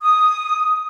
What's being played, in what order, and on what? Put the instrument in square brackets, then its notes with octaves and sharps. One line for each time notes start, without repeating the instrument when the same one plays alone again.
[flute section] D#6